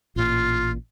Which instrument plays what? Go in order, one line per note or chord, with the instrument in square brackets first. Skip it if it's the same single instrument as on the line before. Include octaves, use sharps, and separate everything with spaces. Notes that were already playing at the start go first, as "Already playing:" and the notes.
[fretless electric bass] A1 A#2 [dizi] F4